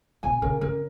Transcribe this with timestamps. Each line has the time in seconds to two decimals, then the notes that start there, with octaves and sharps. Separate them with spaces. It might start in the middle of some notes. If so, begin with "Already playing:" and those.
0.23 B2 G#5
0.42 C#3 A#4
0.61 C#3 A#4